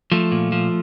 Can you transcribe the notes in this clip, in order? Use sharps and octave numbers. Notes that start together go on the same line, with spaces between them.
F3 A3
A#2
F3